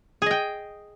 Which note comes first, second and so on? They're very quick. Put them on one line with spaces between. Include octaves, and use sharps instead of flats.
G#4 D#5 G5